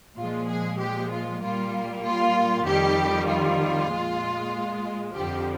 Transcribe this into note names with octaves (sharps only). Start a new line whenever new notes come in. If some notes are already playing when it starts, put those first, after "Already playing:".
A#2 F3 G#3 F4
G#4
G4
F4
A#2 G3 A#3 F4
F4
F2 D#3 G3 G4
F4
A#2 G#3
F2 D3 F3 G4